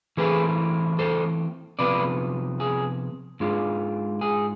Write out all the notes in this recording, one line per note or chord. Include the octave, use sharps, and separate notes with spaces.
E3 A3 C4 E4 G#4 B4
A4 C5
C3 F3 B3 B4 D5
G#4
G#2 G#3 D4 F4
G#4